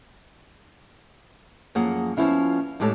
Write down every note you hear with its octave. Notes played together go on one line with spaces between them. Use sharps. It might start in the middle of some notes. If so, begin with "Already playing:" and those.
F#2 F3 A#3 G#4 F#5
F3 B3 C#4 E4 F4
A2 G#3 G4 A4 C#5 A5